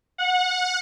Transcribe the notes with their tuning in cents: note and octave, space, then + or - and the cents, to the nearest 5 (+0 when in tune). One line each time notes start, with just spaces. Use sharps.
F#5 -25